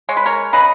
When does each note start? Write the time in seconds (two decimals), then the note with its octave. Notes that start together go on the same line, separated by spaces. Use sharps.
0.09 G#3 C#5
0.17 B4
0.26 A#4 C#5
0.53 C#3 B4 D#5